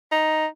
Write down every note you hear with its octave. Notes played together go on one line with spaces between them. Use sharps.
D#4